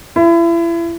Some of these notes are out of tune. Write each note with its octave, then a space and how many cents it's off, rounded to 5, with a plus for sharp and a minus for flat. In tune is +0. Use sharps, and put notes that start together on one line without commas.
E4 +35